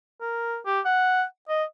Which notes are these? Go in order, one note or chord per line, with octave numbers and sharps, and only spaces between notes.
A#4
G4
F#5
D#5